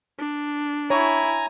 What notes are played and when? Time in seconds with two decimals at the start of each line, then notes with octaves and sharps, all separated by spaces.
0.18 D4
0.90 E4 C#5 G#5 A#5